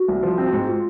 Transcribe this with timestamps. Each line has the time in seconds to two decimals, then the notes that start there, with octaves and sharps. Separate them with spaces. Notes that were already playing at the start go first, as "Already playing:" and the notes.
Already playing: F#4
0.08 C2
0.23 F3
0.38 C4
0.52 G#2
0.68 F4